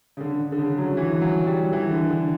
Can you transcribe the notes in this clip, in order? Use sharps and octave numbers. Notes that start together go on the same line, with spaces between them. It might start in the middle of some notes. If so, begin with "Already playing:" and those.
C#3
D3
D3
D3
C#3
F#3
E3
F#3
G3
E3
D3
D3